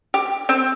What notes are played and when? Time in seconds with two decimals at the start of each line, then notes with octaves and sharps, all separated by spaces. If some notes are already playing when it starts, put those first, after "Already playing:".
0.14 G4
0.49 C4